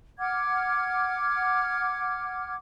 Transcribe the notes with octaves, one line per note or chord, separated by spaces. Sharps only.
F#5 D6 F6 G#6